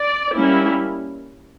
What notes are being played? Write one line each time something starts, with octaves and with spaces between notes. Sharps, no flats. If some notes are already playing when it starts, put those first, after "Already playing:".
Already playing: D5
G3 A#3 C#4 E4